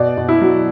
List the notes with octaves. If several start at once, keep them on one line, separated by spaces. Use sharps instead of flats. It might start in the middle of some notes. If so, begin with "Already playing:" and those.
Already playing: B2 D5
B2
E4
F#3